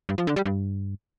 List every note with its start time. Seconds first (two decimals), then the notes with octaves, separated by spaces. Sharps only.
0.09 G2
0.18 F3
0.27 D3
0.36 G3
0.46 G2